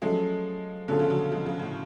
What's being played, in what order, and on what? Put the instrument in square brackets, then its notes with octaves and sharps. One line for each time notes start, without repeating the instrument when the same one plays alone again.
[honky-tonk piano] F3 G#3 [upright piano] F#3 A3 C#4 G#4
[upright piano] B2 A3 C#4 F4 G#4 [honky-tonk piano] D3 F#3
[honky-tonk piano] C#3 F3
D3 F#3
F3 G#3
C#3 F3
A2 C#3